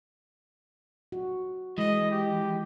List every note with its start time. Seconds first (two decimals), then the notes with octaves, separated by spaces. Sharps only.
1.12 F#4
1.78 E3 G#3 D#5
2.11 G4